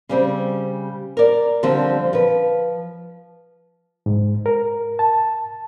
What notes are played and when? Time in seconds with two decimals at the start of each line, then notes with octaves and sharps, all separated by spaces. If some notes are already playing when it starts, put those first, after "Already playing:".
0.09 C#3 G3 C4
1.17 A#4 D5
1.63 D3 F3 G3 C4
2.13 F3 B4
4.06 G#2
4.46 A#4
4.99 A5